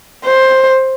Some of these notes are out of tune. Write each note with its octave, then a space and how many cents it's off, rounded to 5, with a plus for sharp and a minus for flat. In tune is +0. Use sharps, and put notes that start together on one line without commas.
C5 +10